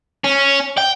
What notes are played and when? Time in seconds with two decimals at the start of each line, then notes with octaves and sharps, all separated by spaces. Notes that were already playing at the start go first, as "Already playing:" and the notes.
0.24 C#4
0.77 G5